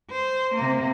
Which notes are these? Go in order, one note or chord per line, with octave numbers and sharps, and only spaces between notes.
C5
C3 A#3